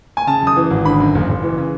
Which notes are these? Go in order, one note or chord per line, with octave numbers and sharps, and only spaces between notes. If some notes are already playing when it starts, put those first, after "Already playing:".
G#5
C#3 A5
F#2 D#6
E3
G#1
D3 B5
F#2
F#1
F#1
E3
C#3